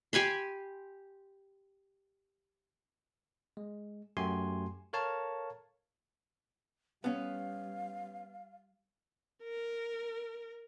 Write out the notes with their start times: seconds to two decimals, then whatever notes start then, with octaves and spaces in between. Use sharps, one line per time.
0.13 G4 G#5 B5 C6
3.57 G#3
4.17 F#2 A3 F#4 G4 G#5 C6
4.93 A4 A#4 C#5 F5 A5
7.04 G3 B3 C#4 F5
9.43 A#4